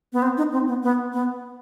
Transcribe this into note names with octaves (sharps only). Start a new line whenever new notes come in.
B3
C4
D#4
C4
B3
B3
B3